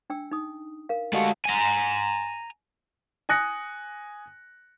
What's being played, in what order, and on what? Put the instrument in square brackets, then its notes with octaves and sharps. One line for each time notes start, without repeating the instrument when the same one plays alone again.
[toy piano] D4 G5 E6
D#4 D#6
A#4 F5
[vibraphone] G#3 F5 A5 [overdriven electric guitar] A3 F#4 [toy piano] G4 D#5 G#5
[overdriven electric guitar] G#5 A#5
[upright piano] G#5 D#6 F#6 A#6 C#7